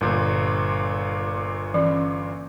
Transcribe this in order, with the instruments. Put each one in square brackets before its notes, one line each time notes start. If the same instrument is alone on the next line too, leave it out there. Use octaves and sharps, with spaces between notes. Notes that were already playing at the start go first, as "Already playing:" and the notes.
[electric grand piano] G1 A#2
[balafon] E3 C#4